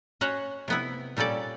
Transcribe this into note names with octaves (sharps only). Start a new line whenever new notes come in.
C#4 F#4 C5 C#5 F#5
C3 B3 E4
A#2 G3 C#4 A4 D5